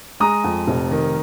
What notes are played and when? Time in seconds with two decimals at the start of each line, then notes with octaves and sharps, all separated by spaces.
0.20 G#3 A#5 D#6
0.44 F2
0.68 F1
0.91 D#3